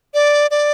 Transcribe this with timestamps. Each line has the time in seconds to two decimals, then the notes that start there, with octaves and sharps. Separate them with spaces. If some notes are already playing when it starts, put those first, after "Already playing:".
0.14 D5
0.51 D5